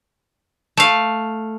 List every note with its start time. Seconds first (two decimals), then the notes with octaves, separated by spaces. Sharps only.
0.77 A3 F5